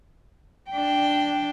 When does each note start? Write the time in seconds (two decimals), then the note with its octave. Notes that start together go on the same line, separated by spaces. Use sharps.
0.71 D4 G5